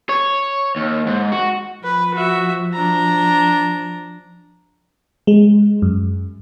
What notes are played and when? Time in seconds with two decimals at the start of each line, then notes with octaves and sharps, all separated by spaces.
0.09 C#5
0.76 D#2
1.07 G#2
1.32 F#4
1.83 F3 B4
2.14 F#4 E5
2.73 D4 A#5
5.27 G#3
5.82 F#2